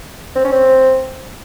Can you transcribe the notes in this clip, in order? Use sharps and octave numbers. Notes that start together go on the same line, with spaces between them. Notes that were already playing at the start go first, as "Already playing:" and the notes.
C4
C#4
C4